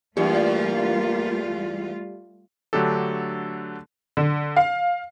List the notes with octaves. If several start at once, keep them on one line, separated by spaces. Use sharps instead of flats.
E2 G2 G3 A3 A#3 F4 G4 D5
D3 F#3 A3 D4 G4 A4
D3
F5